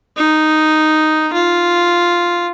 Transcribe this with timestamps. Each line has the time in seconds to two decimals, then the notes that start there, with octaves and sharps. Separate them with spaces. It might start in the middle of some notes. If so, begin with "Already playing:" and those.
0.16 D#4
1.33 F4